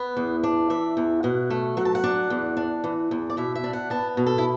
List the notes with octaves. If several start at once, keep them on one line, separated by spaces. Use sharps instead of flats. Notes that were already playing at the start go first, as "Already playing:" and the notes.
Already playing: B3
E2
D4
E3 E5
E2
B2 F#5
A3
F#3 F#5
A5
F#5
D4
E2
D4
E3
E2
D5
B2 E5
E5
D4
F#5
B3 A5
B2
A4
E4